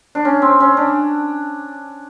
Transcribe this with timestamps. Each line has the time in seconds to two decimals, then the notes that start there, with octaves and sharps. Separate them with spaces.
0.15 D4
0.25 C#4
0.42 C4
0.60 C#4
0.77 D4